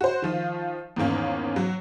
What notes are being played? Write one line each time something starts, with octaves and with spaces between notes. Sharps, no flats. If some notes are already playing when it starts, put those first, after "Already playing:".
F#4 C5
D#3 F3 F4
E2 G#2 D#3 A#3 C#4
F#3